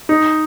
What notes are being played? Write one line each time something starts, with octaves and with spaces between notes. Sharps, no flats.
D#4